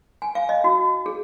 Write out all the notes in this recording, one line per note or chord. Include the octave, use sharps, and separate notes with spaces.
G#5
F5
D#5
F#4
G#4